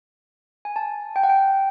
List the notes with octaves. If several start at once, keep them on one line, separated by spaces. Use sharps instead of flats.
G#5
A5
G5
F#5
G5